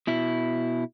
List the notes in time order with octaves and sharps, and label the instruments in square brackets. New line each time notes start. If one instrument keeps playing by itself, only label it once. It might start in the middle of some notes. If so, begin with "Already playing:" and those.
[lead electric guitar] B2 E4